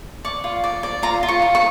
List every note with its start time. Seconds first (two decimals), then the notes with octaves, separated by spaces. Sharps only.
0.25 D5 C#6
0.44 F4
0.64 D5
0.83 D5
1.03 F4 A#5
1.23 F4
1.28 C#6
1.42 F4
1.55 C#6